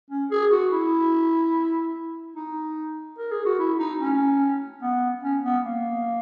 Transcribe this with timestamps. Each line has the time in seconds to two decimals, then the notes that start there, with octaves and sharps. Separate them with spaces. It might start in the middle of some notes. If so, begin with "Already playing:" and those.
0.11 C#4
0.31 G#4
0.51 F#4
0.72 E4
2.36 D#4
3.19 A#4
3.31 G#4
3.45 F#4
3.59 E4
3.79 D#4
4.00 C#4
4.82 B3
5.23 C#4
5.44 B3
5.65 A#3